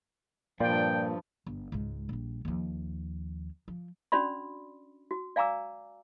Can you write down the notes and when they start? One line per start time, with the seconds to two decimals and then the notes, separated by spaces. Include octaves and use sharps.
0.60 G2 A#2 F3 F4 D5 G5
1.47 G1
1.72 C#2 G#2
2.09 A#1 G3
2.45 D#2 F3
3.68 F3
4.12 C#4 D4 F#4 D5 B5 C6
5.11 F#4
5.36 D5 F5 G#5 A#5 D6 E6